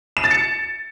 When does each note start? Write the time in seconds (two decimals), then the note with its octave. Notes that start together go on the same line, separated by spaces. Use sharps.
0.17 E7
0.24 A6
0.31 C#7